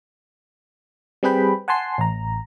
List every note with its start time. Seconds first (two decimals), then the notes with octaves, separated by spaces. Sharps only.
1.23 G3 C4 G#4 B4 G5 B5
1.68 F#5 G#5 A5 C6 C7
1.98 A1 A#5